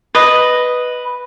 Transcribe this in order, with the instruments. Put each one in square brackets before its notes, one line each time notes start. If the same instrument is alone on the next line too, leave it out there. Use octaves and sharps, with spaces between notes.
[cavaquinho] B4 D#5